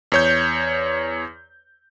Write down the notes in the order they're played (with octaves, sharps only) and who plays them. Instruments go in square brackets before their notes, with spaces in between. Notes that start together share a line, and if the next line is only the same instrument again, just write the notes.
[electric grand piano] E2 C#5 G6